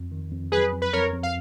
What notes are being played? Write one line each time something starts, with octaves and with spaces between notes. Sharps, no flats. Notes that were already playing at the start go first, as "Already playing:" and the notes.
Already playing: F2
D#3
F2
F#3 G#4 B4
F2
B4
F2 A#4 C#5
F2
F5